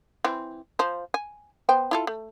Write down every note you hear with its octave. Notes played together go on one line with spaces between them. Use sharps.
E3 C4
F3 C5
G#5
B3 C5 G5
E4 F4 A4
A3